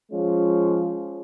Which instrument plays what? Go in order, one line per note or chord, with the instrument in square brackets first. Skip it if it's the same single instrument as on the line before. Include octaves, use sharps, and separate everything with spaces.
[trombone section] F3 G#3 C#4 F4